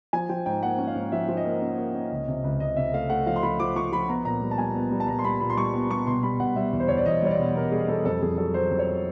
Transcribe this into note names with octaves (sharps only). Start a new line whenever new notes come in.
F3 G#5
F3 G5
G#2 G5
A#3 F#5
C#4
F5
G#2
F3 E5
F3
D#5
A#3
C#4
A#3
C#4
C#2
C3
C#2
C#2 D#5
C3 E5
A3 F5
A3 F#5
F3 F5
C6
F3 B5
F3 D6
F3 C#6
F3 B5
B3 A#5
A#2 A#5
G3
A5
G3 G#5
B3
G3
A5
A#2 A#5
C6
G3 B5
A#2 B5
C6
G3 C#6
B3
G3 C#6
B2 C6
G3 B5
B2 F#5
G3 E5
E2
C5
E2 C#5
D5
E2 D#5
G3 C#5
D5
B2
G3 A#4
G3 G#4
G3 A4
F2 A4
F2 G#4
F#3 A4
F#3 C5
F2
C#5